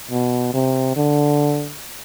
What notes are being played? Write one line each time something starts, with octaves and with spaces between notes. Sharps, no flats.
B2
C3
D3